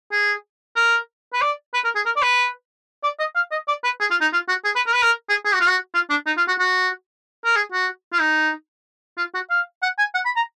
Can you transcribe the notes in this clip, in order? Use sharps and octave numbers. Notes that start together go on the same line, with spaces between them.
G#4
A#4
B4
D5
B4
A#4
G#4
A#4
D5
B4
D5
D#5
F5
D#5
D5
B4
G#4
F4
D#4
F4
F#4
G#4
B4
A#4
B4
A#4
G#4
G#4
F#4
F4
F#4
F4
D4
D#4
F4
F#4
F#4
A#4
G#4
F#4
F4
D#4
F4
F#4
F5
F#5
G#5
F#5
B5
A#5